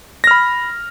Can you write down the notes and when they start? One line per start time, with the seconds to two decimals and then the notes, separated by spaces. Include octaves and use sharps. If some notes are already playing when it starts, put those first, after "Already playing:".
0.24 A#6
0.27 F6
0.31 B5